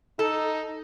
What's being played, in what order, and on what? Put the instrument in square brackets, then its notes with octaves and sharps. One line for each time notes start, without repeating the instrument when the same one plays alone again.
[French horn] D#4 [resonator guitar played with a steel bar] A4